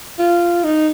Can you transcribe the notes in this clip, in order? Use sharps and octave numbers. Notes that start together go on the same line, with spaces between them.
F4
D#4